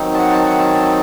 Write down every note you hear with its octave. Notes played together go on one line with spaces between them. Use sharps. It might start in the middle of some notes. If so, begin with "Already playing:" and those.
Already playing: D#3 F#3 C4 D#4
A5
F#5
A5
F#5
A5